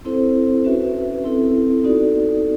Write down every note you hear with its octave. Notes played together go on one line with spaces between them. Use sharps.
C4 E4 A4 C5
C#4 F#4 B4 E5
C4 E4 A4
B3 D#4 F#4 A4 D5